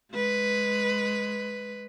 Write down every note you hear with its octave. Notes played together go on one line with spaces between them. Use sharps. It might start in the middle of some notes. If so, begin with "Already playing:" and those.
G#3 B4